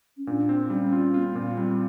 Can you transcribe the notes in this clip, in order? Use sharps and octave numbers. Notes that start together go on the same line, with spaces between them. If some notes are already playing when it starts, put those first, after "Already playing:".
C#4
A#2 D4
C4
G3 C#4
F4
B3 F4
A#3
A#2 B3
G3 C4